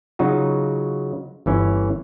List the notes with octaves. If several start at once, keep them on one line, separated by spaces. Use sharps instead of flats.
C#3 F#3 D#4 F4 F#4
G1 E3 C#4